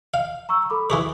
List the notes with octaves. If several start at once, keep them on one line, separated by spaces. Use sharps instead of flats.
F5
A#5 C#6 E6
A4 B5 D6
E3 G#4 B4 C#6 D6